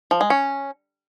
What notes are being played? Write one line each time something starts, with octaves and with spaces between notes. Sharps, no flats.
F3
G#3
C#4